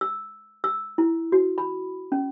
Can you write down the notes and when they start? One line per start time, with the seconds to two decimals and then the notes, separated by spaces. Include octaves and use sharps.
0.01 E6
0.64 E6
0.98 E4
1.32 F#4
1.58 B5
2.12 C#4